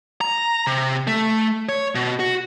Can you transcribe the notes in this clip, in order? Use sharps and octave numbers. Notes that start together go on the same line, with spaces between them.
A#5
C3
A3
C#5
B2
F#4